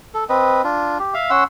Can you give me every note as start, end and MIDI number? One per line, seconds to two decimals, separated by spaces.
0.14 0.24 69
0.29 0.62 60
0.29 0.62 71
0.29 0.62 75
0.64 0.98 62
0.64 0.98 65
0.99 1.14 67
1.14 1.30 76
1.14 1.30 77
1.30 1.44 61
1.30 1.44 78
1.30 1.44 84
1.30 1.44 88